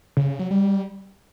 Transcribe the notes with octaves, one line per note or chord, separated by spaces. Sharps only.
C#3
C#3
F#3
G3